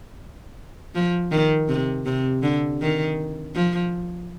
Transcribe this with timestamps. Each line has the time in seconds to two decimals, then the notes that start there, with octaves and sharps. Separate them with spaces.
0.95 F3
1.32 D#3
1.69 C3
2.06 C3
2.43 D3
2.81 D#3
3.55 F3